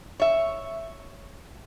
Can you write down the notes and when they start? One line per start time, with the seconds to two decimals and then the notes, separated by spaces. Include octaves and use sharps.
0.20 C#5 E5